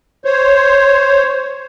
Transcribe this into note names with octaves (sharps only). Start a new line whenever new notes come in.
C5 C#5